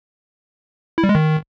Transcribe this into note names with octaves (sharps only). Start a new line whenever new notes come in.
E4
G3
G#3
D#3